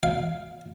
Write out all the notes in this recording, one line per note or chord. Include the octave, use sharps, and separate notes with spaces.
F5